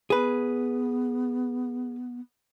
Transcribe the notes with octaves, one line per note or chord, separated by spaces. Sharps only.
B3 G#4 B4